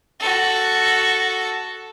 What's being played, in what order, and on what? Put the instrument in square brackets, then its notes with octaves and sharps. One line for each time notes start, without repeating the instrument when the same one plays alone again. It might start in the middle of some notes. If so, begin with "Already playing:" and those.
[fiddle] F#4 A4